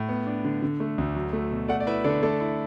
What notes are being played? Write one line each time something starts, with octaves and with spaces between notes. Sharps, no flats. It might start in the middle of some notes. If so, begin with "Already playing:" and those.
Already playing: A2
B3
D4
D3
D3
A3
D2
F#3
A3
B2
A3 D5 F#5
D5
E4 B4 E5
D3 A4 D5
A3 A4 D5
E4